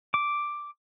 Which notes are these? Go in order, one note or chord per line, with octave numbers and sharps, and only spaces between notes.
D6